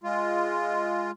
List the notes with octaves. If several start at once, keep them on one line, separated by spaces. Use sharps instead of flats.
G#3 F4